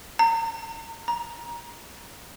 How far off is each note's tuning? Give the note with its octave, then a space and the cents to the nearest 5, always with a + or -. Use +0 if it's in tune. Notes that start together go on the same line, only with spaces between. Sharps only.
A#5 -35
A#5 +20